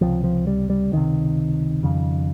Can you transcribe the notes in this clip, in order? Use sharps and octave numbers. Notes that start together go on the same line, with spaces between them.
C#2 C3 F3
F3
G3
G3
C#2 C3 D#3
F2 C#3